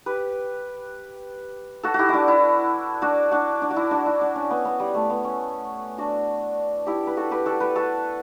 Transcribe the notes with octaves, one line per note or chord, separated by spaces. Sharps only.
G4 B4
F#4 A4
E4 F#4 G4
D4 E4 F#4
E4
D4 F#4
D4 F#4
D4
F#4
E4
D4 F#4
E4
D4
C#4
B3
B3
G3
A3
B3
C#4
D4 F#4
E4 G4
B4
F#4 A4
G4 B4
F#4 A4
G4 B4
F#4 A4